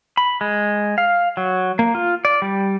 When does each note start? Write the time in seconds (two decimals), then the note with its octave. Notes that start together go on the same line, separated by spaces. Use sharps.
0.17 B5
0.41 G#3
0.98 F5
1.37 F#3
1.79 A#3
1.95 F4
2.25 D5
2.42 G3